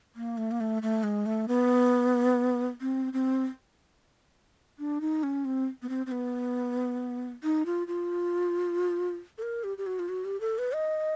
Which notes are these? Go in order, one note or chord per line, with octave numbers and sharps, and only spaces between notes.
A#3
A3
A#3
A3
A3
G#3
A3
B3
C4
C4
D4
D#4
C#4
C4
B3
C4
C4
B3
D#4
F4
F4
A4
A#4
G4
G4
F#4
F4
F#4
G4
A4
B4
D#5